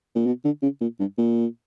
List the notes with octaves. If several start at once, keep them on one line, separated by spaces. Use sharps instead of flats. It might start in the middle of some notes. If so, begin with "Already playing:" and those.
A#2
B2
D3
C#3
A#2
G2
A#2